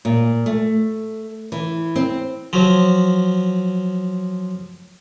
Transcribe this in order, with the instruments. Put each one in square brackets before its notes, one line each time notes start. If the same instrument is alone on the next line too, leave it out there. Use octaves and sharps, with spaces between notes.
[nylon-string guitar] A#2
A3
E3
C4
[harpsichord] F3 F#3